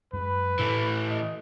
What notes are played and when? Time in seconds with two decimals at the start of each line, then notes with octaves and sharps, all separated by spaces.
0.13 F#2 G#3 B4
0.59 A2 E3 A3
1.09 D#5